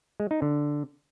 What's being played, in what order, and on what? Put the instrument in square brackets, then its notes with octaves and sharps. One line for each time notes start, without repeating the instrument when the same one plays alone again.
[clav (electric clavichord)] G#3
D#4
D3